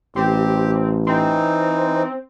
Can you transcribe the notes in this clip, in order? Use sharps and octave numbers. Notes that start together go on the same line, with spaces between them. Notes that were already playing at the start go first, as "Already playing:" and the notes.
A1 C4 G4
E3 C4 D#4